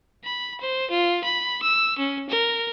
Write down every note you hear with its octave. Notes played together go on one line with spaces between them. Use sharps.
B5
C5
F4
B5
E6
C#4
A#4